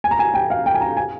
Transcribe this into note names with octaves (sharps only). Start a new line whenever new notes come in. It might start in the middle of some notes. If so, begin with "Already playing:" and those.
G#5
A#5
G#5
G5
F5
G5
G#5
A#5
G#5